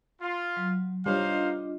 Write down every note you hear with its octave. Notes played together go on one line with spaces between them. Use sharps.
F4
F#3
G3 D4 D#4 F4 C5 C#5 D#5 F5